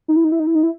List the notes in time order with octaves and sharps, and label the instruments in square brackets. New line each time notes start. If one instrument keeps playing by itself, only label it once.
[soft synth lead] D#4
E4
D#4
E4
D#4
E4
D#4
E4